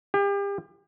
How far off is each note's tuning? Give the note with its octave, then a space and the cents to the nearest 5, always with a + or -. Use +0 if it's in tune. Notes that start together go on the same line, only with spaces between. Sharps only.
G4 +35